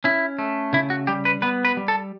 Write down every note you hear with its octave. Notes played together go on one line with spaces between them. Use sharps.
C#4 E4
A3
C#3 E4
F#4
G3 G4
B4
B3 B4
B4
G3
A4